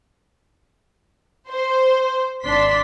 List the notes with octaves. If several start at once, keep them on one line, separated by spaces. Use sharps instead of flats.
C5
G#1 D4 C6 B6